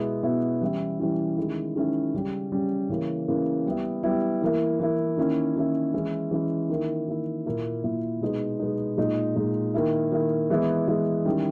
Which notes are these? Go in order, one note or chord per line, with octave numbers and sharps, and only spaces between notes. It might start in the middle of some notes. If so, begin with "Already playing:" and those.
Already playing: B2 G#3 B3 E4
B2 G#3 B3 E4
E3 G3 C#4 E4
E3 G3 C#4 E4
D#3 G#3 C#4 E4
D#3 G#3 C#4 E4
C#3 G3 C#4
C#3 G3 C#4
C#3 E3 A#3
C#3 E3 A#3
G3 B3 E4
G3 B3 E4
E3 A#3 E4
E3 A#3 E4
D#3 A#3 C#4 E4
D#3 A#3 C#4 E4
E3 G#3 C#4 E4
E3 G#3 C#4 E4
D#3 A#3 E4
D#3 A#3 E4
A#2 A#3 E4
A#2 A#3 E4
B2 G#3 B3 D#4
B2 G#3 B3 D#4
A#2 G#3 D#4
A#2 G#3 D#4
D#3 A#3 E4
D#3 A#3 E4
E3 G#3 B3 E4
E3 G#3 B3 E4
D#3 G3 C#4 E4